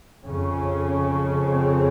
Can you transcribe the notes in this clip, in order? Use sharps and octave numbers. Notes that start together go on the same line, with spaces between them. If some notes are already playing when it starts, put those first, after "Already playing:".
F2 C#3 C#4
C4